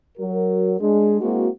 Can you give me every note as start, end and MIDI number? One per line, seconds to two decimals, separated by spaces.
0.17 0.74 54
0.17 0.74 66
0.17 0.74 70
0.79 1.19 56
0.79 1.19 62
0.79 1.19 68
1.21 1.48 56
1.21 1.48 58
1.21 1.48 60
1.21 1.48 64
1.21 1.48 66